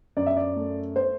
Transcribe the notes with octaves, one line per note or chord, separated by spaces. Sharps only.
F#2 D5
E5
D5
A3
C5